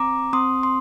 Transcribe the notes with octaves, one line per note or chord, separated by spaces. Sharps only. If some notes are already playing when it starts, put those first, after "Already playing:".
Already playing: C4 A#5 D6
C4 C6 D#6
C6